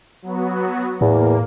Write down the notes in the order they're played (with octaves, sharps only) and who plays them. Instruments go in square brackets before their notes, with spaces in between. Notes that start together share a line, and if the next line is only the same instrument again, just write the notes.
[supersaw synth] F#3 B3 F#4
[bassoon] E2 [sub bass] A2 [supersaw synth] A#3